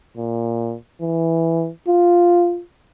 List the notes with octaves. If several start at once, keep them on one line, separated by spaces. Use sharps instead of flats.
A#2
E3
F4